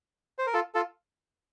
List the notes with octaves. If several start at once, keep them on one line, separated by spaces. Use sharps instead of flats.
C5
A#4
F4 A4
F4 A4